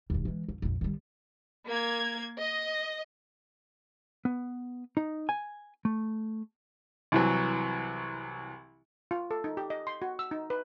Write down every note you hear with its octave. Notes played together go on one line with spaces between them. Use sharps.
E1 D#2
E3 G#3
F2
A#1 F2
D#3 G3
A#3 G#6
D#5
B3
D#4
G#5
A3
C2 E3 F#3
F4
A4
D#4
G4
D#5
C6
F#4
E6
D#4
B4